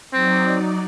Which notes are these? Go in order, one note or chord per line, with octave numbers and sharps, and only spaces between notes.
F#3 C4 D#4 D5